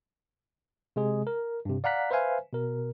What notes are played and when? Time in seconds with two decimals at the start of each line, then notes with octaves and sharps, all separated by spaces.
0.96 C3 G#3 G#4
1.27 A#4
1.65 G2 C3
1.84 D5 F5 F#5 A#5 F#6 B6
2.11 B4 C5 E5 F5 G#5
2.53 B2 A#4